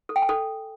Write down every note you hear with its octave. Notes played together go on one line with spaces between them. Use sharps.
A4
G5
G#5
A4